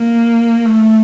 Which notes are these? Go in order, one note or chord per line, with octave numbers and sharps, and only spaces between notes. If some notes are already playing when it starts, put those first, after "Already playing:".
Already playing: A#3
A3